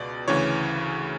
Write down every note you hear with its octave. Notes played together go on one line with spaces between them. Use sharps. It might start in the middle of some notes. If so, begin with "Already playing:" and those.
Already playing: C#2 B2 D5
D2 C#3 E3 C#5